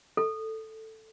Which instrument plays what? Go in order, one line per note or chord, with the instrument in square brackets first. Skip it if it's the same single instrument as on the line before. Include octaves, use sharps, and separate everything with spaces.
[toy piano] A4